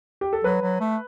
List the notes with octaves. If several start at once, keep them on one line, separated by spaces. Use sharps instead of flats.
G4
A4
F#3 B4
F#3
A3